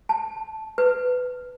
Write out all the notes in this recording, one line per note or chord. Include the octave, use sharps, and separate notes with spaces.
A5
B4